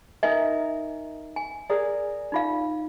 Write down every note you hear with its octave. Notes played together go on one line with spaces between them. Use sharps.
D#4 A#4 D#5 E5 G#5
G#5
G#4 A#4 D5
D#4 F4 F5